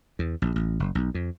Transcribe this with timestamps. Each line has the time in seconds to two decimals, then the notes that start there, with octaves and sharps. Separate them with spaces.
0.19 E2
0.42 A#1
0.56 A1
0.80 F#1
0.95 B1
1.14 F2